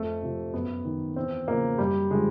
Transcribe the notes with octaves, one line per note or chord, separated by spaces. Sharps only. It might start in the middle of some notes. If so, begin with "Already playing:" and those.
Already playing: F2 A3
C3 F3
F#2 B3
D#3
E2 C4
C#3 F3 A#3
F#2 G3
D3 F3 G#3